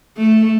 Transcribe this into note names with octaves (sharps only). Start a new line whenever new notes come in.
A3